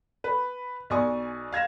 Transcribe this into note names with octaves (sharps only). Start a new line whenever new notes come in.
B4
B1 D5 G#5 C#6 D#6
F5 G#6 A#6 E7